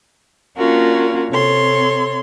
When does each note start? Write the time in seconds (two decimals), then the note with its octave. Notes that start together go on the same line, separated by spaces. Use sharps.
0.56 A#3 C#4 D4 F4 F#4 A#4
1.31 C3 A4 C#5 C6